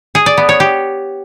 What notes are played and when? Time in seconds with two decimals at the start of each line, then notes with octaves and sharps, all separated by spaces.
0.15 G#4
0.26 D5
0.37 B3
0.49 C#5
0.60 G4